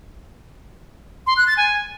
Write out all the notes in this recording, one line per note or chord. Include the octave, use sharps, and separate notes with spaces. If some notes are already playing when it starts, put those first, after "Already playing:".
C6
F#6
A6
G#5